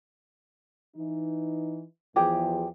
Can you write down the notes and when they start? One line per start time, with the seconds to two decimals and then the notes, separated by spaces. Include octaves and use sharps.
0.96 E3 D#4
2.16 E2 F3 G4 G#4 G5